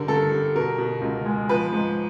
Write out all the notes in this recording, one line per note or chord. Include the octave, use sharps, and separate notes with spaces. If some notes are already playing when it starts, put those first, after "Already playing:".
Already playing: D3 G3 A#4
G2 A4
G3
B2 A#4
B2
C#2
G#3
F3 B4
G#2